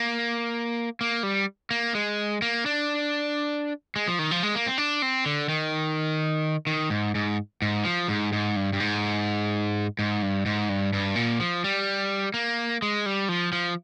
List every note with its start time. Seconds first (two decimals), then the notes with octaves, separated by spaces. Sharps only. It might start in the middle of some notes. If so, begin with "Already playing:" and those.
Already playing: A#3
1.01 A#3
1.23 G3
1.71 A#3
1.95 G#3
2.42 A#3
2.66 D4
3.96 G#3
4.08 F3
4.19 D#3
4.31 F3
4.43 G#3
4.55 A#3
4.66 C4
4.78 D4
5.02 C4
5.26 D3
5.49 D#3
6.67 D#3
6.90 G#2
7.15 G#2
7.62 G#2
7.85 F3
8.08 G#2
8.33 G#2
8.56 G2
8.73 G2
8.80 G#2
9.99 G#2
10.22 G2
10.46 G#2
10.69 G2
10.93 G2
11.16 A#2
11.40 F3
11.64 G3
12.34 A#3
12.82 G#3
13.06 G3
13.29 F3
13.53 F3